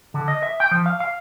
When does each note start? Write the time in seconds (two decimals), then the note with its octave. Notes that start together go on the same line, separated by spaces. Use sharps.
0.14 D3
0.28 D#5
0.43 E5
0.60 G5
0.71 F3
0.86 F5
1.00 F5